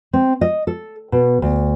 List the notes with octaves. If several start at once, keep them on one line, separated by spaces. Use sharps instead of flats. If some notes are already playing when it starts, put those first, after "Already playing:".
C4
D#5
A4
B2
D2